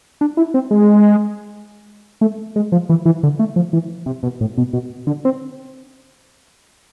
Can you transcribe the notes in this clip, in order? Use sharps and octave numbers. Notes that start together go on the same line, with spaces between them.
D4
E4
C4
G#3
A3
G#3
F3
E3
E3
D3
A3
F3
E3
C3
B2
A2
B2
B2
D3
C4